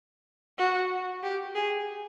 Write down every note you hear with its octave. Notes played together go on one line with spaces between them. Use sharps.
F#4
G4
G#4